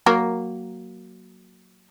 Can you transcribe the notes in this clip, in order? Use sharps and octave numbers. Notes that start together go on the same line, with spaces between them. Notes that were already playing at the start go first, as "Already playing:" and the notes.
F#3 A#3 A#4